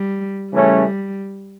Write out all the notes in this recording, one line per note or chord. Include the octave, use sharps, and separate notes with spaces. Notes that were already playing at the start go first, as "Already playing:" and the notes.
Already playing: G3
C#3 E3 G3 A3 C#4